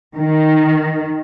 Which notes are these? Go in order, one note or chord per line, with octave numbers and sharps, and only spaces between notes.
D#3